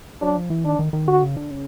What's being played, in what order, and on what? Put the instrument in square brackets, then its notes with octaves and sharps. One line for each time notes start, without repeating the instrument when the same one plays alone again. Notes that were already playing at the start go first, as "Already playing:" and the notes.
[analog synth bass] F#3 [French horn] D4
[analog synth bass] F3
E3
[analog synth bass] D#3 [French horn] D4
[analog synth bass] D#3
D#3
[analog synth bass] D3 [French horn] F#4
[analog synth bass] C#3
D3
C#3